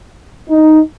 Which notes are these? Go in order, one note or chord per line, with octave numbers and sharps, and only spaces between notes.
D#4